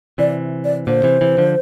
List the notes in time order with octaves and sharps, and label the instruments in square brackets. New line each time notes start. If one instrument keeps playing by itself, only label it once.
[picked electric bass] C3 E3 [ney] D5
[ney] D5
[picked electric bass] A#2 D3 [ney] C5
[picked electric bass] C3 E3
C3 E3
D3 F3